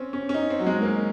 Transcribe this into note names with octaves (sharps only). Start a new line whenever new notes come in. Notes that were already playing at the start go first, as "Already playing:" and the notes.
Already playing: C4 C#4
C#4
C#4
D#4
C4
F#3
G#3
A#3